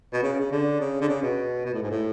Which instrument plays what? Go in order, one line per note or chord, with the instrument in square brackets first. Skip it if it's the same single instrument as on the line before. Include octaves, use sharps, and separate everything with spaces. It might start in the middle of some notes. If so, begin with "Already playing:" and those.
[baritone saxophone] B2
C#3
C#3
D3
C#3
D3
C#3
B2
B2
A2
G#2
A2